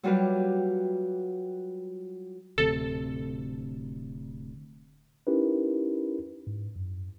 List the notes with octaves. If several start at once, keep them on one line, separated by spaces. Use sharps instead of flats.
F#3 G3 F4 G4 B4
D1 D2 C3 A4
C#4 D#4 E4 G4 A#4 B4
G#2
F#2